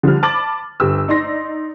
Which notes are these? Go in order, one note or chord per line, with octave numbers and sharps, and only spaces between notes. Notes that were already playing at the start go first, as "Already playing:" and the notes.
D3 F3 G3 F6
A5 B5 D6 A6 F#7
G1 G4 E6
D#4 D5 C6 A#6